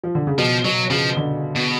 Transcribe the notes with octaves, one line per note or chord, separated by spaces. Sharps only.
F3
D3
C#3
B2 F3
B2 F#3
C#3 F3
D3
B2